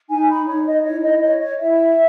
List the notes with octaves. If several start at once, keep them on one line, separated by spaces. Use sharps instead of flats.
D#4 G#5
B5
D#4 C#5
D#5
E4 C#5
D#5
C#5 D#5
C#5
E4 E5